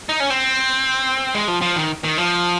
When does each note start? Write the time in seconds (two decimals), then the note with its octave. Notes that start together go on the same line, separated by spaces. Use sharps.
0.09 D#4
0.20 C#4
0.30 C4
1.35 G#3
1.48 F3
1.62 F3
1.76 D#3
2.04 D#3
2.18 F3